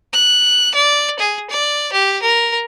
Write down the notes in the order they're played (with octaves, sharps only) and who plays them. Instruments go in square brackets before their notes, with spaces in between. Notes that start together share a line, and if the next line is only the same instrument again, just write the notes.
[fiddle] F#6
D5
G#4
D5
G4
A#4